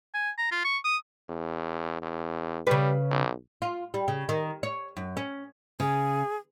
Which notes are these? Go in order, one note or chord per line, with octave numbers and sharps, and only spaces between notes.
G#5
A#5
F4
C#6
D#6
E2
E2
C#3 G3 B4
B1
F4
G3
C#3
D#3
C#5
F#2
C#4
C#3 G#4